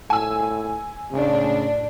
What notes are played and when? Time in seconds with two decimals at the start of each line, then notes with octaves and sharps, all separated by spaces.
0.10 A2 G#5 E6
1.12 A2 C#3 D4